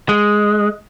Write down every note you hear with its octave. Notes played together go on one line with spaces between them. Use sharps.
G#3